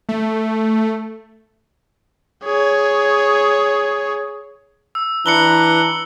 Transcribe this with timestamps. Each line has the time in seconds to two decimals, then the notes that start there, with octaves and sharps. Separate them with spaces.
0.09 A3
2.44 G#4 C#5
4.95 E6
5.26 E3 D4 B4 A#5 C#7 F#7 G7